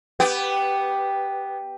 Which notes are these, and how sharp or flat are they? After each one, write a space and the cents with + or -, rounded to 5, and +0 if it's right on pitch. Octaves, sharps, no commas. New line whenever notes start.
B3 +0 G4 +0 B4 +20